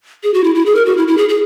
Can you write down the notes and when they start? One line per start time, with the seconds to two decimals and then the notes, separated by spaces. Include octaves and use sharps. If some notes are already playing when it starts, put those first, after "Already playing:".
0.23 G#4
0.34 F#4
0.44 E4
0.55 E4
0.66 G#4
0.75 A#4
0.86 F#4
0.97 E4
1.08 E4
1.18 G#4
1.29 G#4